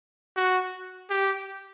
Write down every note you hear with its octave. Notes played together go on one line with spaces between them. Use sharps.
F#4
G4